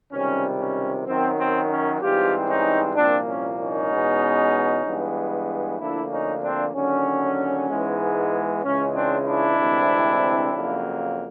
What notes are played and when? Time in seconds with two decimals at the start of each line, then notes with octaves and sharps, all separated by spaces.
0.12 C#2 C3 D#3 G3 C#4
0.59 C#4
1.06 F#2 D#3 F#3 C4
1.38 C4
1.69 C#4
2.01 G#2 E3 G3 C4 F4 G4
2.48 C#4 D#4
2.95 C2 A#2 F3 A#3 C4 D4
3.28 C#4
3.59 C#4 D#4
3.91 E2 B2 G#3 B3
4.85 G2 E3 G#3 B3
5.79 D2 D3 F3 A#3 D4 E4
6.11 C#4 D#4
6.42 C4 D4
6.74 D#2 D3 F#3 C#4
7.69 G#2 E3 G#3 B3
8.63 C#2 C#3 E3 G#3 C#4
8.95 C4 D4
9.26 D4 E4
9.58 D2 C3 E3 G#3 C4
10.52 F2 C#3 F#3 A#3